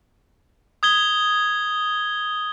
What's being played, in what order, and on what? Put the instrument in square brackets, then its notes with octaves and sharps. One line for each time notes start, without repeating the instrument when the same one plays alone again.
[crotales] D#6 G#6 G7